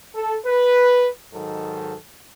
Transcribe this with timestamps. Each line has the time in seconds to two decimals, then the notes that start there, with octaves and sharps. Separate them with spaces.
0.15 A4
0.45 B4
1.33 G#2 D#3 F#3 A4